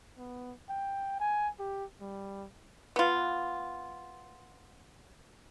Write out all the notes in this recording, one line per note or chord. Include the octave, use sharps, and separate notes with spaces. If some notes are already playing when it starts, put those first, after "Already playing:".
B3
G5
G#5
G4
G3
B3 F4